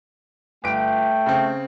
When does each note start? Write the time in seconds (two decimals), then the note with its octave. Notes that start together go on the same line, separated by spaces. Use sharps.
0.64 G1 A3 G5 D7
1.26 C#3 C4